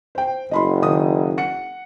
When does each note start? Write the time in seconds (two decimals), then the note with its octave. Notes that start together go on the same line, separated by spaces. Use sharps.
0.15 C5 G5
0.51 F#1 D#5 B5 C6
0.82 D#3 D#6
1.38 F#5 C#7